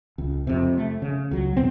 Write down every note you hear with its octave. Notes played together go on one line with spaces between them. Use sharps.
C#2
F2 C3
A3
C#3
C#2 F#3
E2 B2 C4